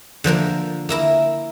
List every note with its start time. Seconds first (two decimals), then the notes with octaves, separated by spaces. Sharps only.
0.24 D3 F3 A#3 A#4
0.89 A#3 E4 A#4